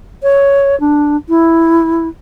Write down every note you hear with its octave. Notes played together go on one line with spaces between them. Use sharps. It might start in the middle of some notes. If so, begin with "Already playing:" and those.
C#5
D4
E4